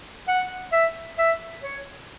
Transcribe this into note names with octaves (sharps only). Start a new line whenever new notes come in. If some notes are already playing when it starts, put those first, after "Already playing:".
F#5
E5
E5
C#5